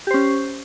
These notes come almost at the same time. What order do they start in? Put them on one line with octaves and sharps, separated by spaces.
G4 C5 C#4